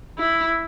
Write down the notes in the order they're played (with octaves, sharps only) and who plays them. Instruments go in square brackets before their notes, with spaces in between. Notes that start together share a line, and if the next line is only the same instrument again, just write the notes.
[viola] E4